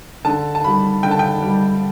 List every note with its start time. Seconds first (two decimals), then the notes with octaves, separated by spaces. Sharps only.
0.25 D3 A5
0.55 A5
0.64 G3 B5
1.03 D3 G5
1.11 A5
1.19 G5
1.42 G3